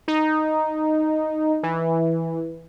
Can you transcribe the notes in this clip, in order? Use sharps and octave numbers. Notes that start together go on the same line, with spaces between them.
D#4
E3